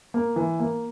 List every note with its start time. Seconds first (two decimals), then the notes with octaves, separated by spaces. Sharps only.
0.14 A#3
0.36 E3
0.60 A#3